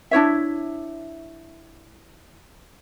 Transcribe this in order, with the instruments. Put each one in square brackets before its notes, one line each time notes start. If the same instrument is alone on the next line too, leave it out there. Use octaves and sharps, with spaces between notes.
[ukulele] D4 E4 C#5 E5